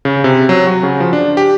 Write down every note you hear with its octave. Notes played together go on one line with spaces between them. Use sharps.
C#3
C3
F#3
F#4
C#3
F3
D4
G4